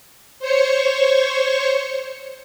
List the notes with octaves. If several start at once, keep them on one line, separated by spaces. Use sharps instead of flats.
C5 C#5 C#6